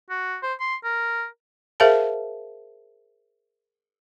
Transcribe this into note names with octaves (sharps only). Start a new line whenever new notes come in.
F#4
C5
C6
A#4
G#4 A#4 C5 E5 F5 A5